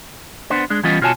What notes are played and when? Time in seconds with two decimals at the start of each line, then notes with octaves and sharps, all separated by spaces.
0.50 B3 D4 C5
0.70 G#3 D4
0.83 E3 G3 B3 C#4 F4 D#5
1.01 B2 F4 F#4 C#5 G#5 A5